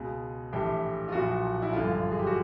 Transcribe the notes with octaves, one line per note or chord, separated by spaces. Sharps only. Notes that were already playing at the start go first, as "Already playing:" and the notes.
Already playing: C#2 B2 G#4
A#1 A2 E3 G4
F4
B1 A#2 F3 F#4
E4
G1 F#2 D3 F3 F4
G#4
G4
F#4